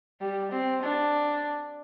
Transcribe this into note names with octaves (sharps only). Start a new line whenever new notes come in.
G3
C4
D4